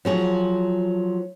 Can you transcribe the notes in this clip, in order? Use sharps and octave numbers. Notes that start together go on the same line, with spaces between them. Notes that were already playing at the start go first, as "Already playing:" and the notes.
F3 F#3 G#4